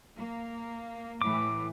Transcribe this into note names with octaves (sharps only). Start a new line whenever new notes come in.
A#3
A2 E3 A3 D6